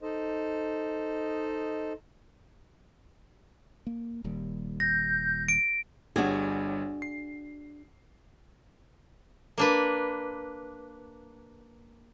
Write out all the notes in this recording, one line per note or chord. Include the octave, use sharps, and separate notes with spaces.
D#4 A4 C5 D#5
A#3
D#1 D#2 G3
G6 A#6
D7
G1 G3 D4 F#4 G#4 C#5
C7
A#3 D4 B4